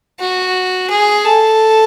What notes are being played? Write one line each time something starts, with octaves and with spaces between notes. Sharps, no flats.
F#4
G#4
A4